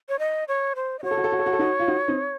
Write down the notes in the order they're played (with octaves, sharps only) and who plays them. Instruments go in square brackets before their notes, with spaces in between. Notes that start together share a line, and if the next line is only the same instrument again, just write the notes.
[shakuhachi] C#5
D#5
C#5
C5
D#5
[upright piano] F#4 [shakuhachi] C#5
[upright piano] A4
F#4
A4
F#4
A4
F#4
A4
D#4 F#4
F4
D#4 F#4
C4 D#4